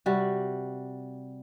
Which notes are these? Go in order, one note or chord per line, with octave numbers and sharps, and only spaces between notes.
C3 G3 F#4